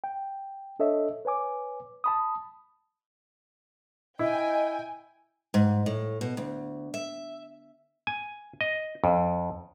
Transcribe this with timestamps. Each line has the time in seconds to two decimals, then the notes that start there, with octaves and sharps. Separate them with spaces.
0.04 G5
0.79 D4 A4 C#5 D#5 E5
1.25 B4 C#5 G#5 D6
2.04 A5 B5 D#6
4.19 E4 D#5 G5 G#5
5.54 G#2
5.86 A2
6.21 B2
6.37 D2
6.94 E5
8.07 G#5
8.61 D#5
9.04 F2